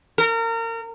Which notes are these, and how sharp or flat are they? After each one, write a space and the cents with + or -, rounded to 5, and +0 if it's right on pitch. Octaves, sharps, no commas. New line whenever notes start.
A#4 -30